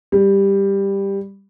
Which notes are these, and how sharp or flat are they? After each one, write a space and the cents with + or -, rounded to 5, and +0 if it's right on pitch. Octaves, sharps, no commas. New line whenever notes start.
G3 +10